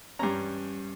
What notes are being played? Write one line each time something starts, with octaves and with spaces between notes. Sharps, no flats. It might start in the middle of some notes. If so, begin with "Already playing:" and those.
G2 G3 C#4 A#5